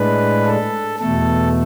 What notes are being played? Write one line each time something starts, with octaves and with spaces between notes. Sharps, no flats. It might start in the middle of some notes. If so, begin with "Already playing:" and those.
Already playing: A2 G#3 D4 B4
A4
E2 B2 A3 A4